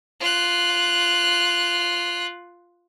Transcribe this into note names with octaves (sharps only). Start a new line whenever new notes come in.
F4 F#6